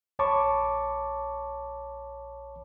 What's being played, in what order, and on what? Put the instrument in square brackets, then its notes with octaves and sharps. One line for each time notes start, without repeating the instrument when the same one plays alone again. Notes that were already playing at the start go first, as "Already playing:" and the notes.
[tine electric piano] A#1 C#5 A5 B5 C#6 D6